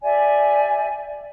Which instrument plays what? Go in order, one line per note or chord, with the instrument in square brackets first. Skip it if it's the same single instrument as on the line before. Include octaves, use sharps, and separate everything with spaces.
[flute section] G4 D5 E5 G#5